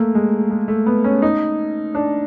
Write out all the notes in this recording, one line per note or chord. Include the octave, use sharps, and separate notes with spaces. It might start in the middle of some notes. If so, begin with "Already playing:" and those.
Already playing: A3 A#3
G#3
G#3
A3
B3
C#4
D#4
D4